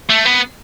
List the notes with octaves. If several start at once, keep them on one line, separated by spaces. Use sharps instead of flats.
A3
B3